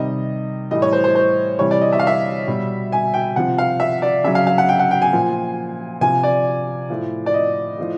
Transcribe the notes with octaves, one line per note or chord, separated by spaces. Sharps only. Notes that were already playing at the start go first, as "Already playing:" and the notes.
Already playing: C3 D#3 G3 D#5
A2 E3 G3 D#5
C#5
C5
C5
C5
C3 E3 G3 C#5
D5
D#5
E5
F5
E5
B2 G3
G#5
G5
C3 F3 F#5
F5
E5
D5
C#3 F#3 E5
F5
F5
F#5
G5
F#5
G5
G#5
A#2 F3
C3 F3 G#5
D5
A2 F3
D5
D#5
A2 F3